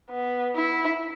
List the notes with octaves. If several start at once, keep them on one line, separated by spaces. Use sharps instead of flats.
B3
E4